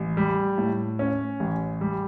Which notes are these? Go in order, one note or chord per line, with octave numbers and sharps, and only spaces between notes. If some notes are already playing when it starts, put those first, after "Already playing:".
Already playing: A1
G3
A2
C#4
A1
G3